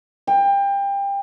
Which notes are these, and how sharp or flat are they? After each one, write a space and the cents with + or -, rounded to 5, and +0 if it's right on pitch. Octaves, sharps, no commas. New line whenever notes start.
G5 +25